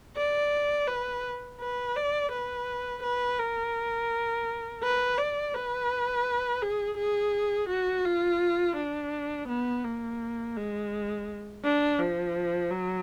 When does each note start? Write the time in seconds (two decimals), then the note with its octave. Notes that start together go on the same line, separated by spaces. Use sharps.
0.17 D5
0.87 B4
1.60 B4
1.96 D5
2.32 B4
3.03 B4
3.39 A#4
4.83 B4
5.18 D5
5.54 B4
6.62 G#4
6.98 G#4
7.69 F#4
8.05 F4
8.77 D4
9.49 B3
9.84 A#3
10.57 G#3
11.65 D4
12.00 F3
12.71 F#3